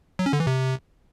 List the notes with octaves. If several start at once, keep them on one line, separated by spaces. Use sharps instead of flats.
F#3
C#4
D3
E3
C3